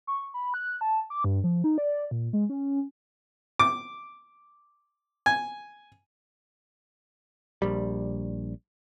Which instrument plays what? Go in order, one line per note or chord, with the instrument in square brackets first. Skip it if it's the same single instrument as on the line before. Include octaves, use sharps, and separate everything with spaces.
[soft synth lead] C#6
B5
F#6
A5
D6
G2
F3
D#4
D5
A#2
G#3
C#4
[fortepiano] D6
G#5
[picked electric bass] A#1 G3